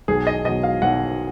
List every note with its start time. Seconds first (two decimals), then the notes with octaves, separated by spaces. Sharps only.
0.08 B1 G#4
0.27 D#5
0.45 B2 F#3 D#5
0.63 F5
0.82 B1 F#5